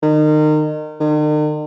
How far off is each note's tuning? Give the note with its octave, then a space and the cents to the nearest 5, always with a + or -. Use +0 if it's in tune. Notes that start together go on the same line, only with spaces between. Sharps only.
D#3 -30
D#3 -45